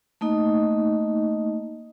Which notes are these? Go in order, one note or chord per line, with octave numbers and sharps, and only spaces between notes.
A3 A#3 D#4 D#5